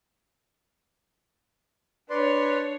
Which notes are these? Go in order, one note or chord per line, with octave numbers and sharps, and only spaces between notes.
D4 B4 C#5 D5 C6